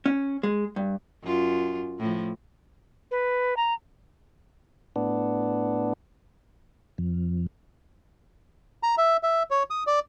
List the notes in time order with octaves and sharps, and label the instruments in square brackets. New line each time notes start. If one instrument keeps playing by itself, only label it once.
[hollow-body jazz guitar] C#4
G#3
G2
[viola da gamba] F#2 F4
A2 F3
[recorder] B4
A#5
[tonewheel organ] A2 B3 D4
F2
[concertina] A#5
E5
E5
C#5
D#6
D5